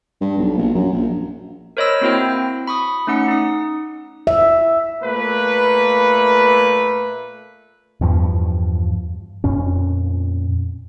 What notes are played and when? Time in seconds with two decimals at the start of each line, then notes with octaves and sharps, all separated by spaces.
0.21 G2
0.38 B1
0.57 A#1
0.74 F#2
0.93 A#1
1.77 A#4 C5 C#5 D#5 B5 E6
2.01 A#3 C4 E4 F#4 C5 G5
2.68 B5 C#6 D#6
3.07 A3 C#4 D#4 F#5 C#7
3.28 D#4 D#6
4.27 E5
5.03 A#2 A3 A#3 B4
8.01 E2 G2 F3
9.44 F2 A#2 C#4